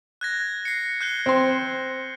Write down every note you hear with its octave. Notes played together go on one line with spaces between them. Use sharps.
F#6 G#6 A#6
C7 C#7
F#6 G6 G7
C4 C6